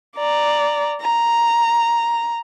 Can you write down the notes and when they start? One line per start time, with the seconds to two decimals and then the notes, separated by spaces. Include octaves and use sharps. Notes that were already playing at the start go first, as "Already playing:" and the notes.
0.17 D5 A#5
1.02 A#5